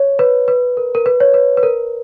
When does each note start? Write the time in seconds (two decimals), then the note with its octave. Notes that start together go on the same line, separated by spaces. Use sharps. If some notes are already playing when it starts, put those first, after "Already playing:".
Already playing: C#5
0.19 B4
0.48 B4
0.77 A#4
0.95 A#4
1.06 B4
1.20 C#5
1.34 B4
1.57 B4
1.63 A#4